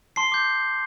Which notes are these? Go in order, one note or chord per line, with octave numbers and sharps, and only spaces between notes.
A5 C6 C7
D6 G6